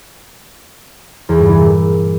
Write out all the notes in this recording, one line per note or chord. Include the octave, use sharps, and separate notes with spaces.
E2
G2
E3
A#2